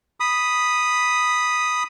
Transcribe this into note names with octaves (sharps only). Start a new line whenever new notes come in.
B5 D#6